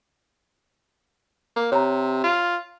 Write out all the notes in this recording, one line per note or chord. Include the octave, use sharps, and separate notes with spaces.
A#3
C3 C#5 A#5
F4